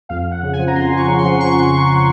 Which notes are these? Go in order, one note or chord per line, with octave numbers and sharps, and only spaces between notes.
F2 F5
F2
F#5
C#3
G#5
F3
A#5
F2 C6
F2
C#6
C#3
C6
F3
C#6